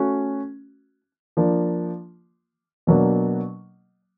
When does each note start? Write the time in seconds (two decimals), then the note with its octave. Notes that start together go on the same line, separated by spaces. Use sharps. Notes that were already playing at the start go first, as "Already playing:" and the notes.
Already playing: A3 C#4 F#4
1.37 F3 A#3 D4
2.87 B2 F#3 A#3 D4